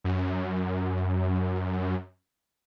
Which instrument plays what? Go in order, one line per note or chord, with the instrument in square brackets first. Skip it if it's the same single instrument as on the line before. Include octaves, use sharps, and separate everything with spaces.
[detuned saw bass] F#2